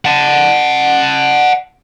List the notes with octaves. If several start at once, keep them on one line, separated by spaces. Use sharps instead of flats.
F#5 A5